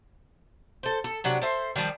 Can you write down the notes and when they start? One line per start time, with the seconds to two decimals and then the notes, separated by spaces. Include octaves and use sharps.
0.83 A4 C5
1.04 A4
1.24 C3 F#3 D4 F#5
1.42 A4 C5 E5
1.76 D#3 F3 G3 A5